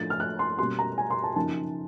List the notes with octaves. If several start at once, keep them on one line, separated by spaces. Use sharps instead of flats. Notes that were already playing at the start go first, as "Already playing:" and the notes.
Already playing: A2 F3 A3 D4 F4 A6
F6
F#6
C6
B2 G3 A#3 C#4 C6
A#5
G#5
C6
A5
F#2 C#3 F3 A#3 D#4 A5